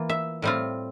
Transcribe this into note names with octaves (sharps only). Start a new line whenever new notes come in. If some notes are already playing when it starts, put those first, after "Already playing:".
Already playing: E3 A#3 F4
E5
A2 G3 C4 F4